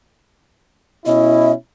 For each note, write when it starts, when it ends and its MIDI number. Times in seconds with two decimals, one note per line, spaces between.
1.06 1.52 47
1.06 1.52 61
1.06 1.52 64
1.06 1.52 75